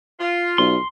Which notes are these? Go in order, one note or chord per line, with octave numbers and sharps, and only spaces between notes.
F4
B1 C6